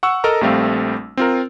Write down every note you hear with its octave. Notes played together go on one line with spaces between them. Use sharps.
F#5 C#6 E6
A4 A#4 D#5 A#5
A#1 G3 A3 C4 F5
C4 F4 A#4